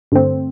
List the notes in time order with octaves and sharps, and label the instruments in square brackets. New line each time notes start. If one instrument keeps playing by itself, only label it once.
[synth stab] G2 D3 A3 C4